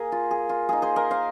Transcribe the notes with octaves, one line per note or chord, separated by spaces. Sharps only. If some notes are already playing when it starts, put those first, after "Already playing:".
Already playing: A#3 G#4 A#4
F4
G#4
F4
A#3 D#4 G#4
G#4 C5
A#4 D#5
C5 F5